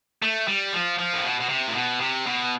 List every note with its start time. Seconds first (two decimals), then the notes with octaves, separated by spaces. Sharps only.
0.22 A3
0.48 G3
0.73 F3
0.99 F3
1.13 A2
1.24 B2
1.40 B2
1.49 C3
1.68 A2
1.75 B2
2.00 C3
2.26 B2